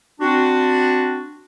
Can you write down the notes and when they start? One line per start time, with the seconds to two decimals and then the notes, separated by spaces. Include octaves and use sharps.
0.21 C4 D4 F#4